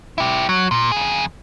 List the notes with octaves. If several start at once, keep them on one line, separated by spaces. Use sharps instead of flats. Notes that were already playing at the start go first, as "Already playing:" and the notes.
E4 G4
F#3
A#2
F2 G#4